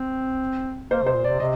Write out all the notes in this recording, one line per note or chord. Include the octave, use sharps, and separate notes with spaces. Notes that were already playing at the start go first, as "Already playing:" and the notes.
Already playing: C4
A#3 C5
C3 C5
A#2
D5
C3
C3 D#5